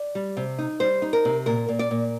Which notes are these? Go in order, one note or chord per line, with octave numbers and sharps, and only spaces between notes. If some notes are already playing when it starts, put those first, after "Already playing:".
Already playing: D5
G3
C3
D#4
G3 C5
D#4
A#4
C3
A#2 A#4
A#2
D5
A#2